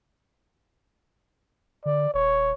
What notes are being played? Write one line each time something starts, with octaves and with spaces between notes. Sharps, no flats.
D3 D5
D#1 C#5